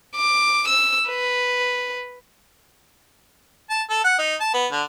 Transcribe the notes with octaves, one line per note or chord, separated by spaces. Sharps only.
D6
E6
B4
A5
A4
F#5
D#4
A5
B3
D3